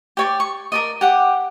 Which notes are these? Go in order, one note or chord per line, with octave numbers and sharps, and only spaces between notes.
G4 C#5 D5
C#6
A#4 D5 D#5
G4 F#5